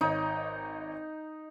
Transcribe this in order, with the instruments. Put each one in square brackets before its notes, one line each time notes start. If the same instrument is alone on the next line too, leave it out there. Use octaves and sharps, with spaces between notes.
[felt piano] G#1 C#5 D#5 [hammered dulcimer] D#4